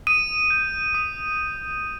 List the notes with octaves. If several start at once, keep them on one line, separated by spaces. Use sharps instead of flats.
D#6 D#7
G6
D#6